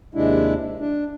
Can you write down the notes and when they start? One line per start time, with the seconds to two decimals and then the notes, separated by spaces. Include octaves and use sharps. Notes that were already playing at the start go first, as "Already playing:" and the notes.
0.15 D#2 C3 G#3 D4 E4
0.80 D4